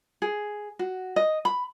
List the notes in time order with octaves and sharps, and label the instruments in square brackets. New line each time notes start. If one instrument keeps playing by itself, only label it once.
[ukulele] G#4
F#4
D#5
B5